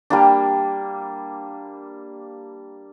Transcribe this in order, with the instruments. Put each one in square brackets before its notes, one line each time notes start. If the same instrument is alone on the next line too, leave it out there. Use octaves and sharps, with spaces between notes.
[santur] G3 A#3 D4